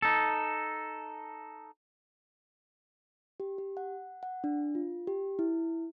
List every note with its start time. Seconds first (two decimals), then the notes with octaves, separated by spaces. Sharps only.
0.02 D#4 A4
3.40 G4
3.58 G4
3.77 F#5
4.23 F#5
4.44 D4
4.75 F4
5.07 G4
5.39 E4